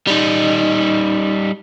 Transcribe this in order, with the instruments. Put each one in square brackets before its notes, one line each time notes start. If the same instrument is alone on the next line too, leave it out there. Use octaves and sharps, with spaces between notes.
[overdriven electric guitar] G3 D#4